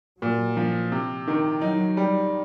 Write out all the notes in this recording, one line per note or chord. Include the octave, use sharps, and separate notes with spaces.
A#2 F#3
F3
C3
D#3
F#3 D#4
G3